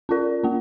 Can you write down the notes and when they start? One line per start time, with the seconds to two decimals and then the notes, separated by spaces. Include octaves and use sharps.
0.09 C#4 F4 A#4 D5
0.43 A#3 C#4